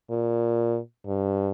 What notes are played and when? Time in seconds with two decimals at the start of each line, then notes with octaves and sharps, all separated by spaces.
0.10 A#2
1.06 G2